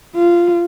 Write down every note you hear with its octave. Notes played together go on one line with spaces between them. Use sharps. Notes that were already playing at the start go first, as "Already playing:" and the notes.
F4